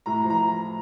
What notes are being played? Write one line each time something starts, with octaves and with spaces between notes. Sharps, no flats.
A2 A#5
F3
A#5